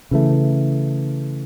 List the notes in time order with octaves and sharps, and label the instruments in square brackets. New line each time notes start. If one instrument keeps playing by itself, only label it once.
[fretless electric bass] C#3 E3 A3